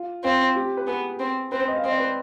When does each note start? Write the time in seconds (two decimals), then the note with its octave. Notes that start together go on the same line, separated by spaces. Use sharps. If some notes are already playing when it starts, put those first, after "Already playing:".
Already playing: F4
0.24 C4 F4
0.55 G4
0.77 B4
0.87 B3 G#4
1.20 C4
1.52 C4 B4
1.59 C5
1.68 D#5
1.76 F5
1.84 C4 D#5
1.92 D5
2.00 B4